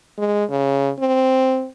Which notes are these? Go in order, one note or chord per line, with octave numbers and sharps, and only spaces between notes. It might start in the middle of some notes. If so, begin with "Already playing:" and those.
G#3
C#3
C4